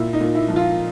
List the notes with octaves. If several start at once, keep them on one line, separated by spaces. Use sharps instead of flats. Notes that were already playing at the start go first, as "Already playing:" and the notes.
Already playing: A#2 E4
D#4
A#2
E4
F3
F4